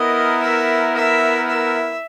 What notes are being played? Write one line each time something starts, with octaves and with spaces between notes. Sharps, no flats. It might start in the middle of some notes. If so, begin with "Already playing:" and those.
Already playing: B3 E4 A#4 D#5
E5
E5
E5